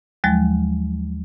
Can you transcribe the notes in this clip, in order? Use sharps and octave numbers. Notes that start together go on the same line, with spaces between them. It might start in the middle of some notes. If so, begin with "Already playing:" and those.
D#2 F3 F#3 G#3